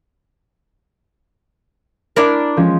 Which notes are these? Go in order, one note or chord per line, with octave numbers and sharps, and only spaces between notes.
D4 E4 A#4
F3 G#3 C#4